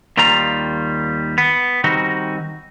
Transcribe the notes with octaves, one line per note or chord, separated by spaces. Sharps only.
D#2 D#3 G3 F4 A#5
B3
D#3 G3 C4 D#4 F#4